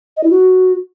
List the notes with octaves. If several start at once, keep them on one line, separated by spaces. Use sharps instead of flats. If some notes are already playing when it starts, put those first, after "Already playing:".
D#5
E4
F#4